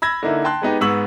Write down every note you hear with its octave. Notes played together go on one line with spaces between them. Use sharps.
B5 E6 G#6 A#6
D3 A#3 D#4 E4
G5 A5 C6 F#6
G#3 B3 D#4 G4
G#2 B3 C#6 E6 F#7